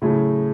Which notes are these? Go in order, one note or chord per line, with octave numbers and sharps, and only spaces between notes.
A2 C#3 F#3 A3